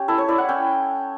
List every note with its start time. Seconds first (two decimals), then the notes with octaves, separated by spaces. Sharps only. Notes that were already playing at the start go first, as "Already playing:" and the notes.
Already playing: C#4 G4
0.08 E4 A4
0.18 C#5
0.28 E4 D5
0.38 F#5
0.49 C#4 G5